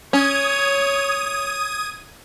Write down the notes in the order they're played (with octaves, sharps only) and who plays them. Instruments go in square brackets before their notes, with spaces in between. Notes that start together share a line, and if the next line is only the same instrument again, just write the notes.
[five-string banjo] C#4 [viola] C#5 [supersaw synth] D#6 G#6 D#7